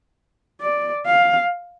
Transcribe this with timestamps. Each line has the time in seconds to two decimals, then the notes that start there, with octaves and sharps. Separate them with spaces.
0.61 D5
1.06 F5